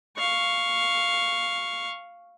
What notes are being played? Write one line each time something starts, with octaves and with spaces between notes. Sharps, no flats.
F5 C#6